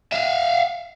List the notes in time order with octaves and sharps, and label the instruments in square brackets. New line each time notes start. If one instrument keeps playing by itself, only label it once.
[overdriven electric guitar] E5 F5